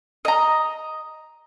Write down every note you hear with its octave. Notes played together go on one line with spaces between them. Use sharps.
D#5 A#5